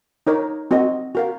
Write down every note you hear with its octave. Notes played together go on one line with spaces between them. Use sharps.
D#4 A#4 C#5
C4 F#4 A#4 D#5
F#4 A#4 F5